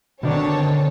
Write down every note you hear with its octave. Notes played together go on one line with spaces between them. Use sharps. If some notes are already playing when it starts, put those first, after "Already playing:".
B2 D3 D#3 C4 D4 C#5 A5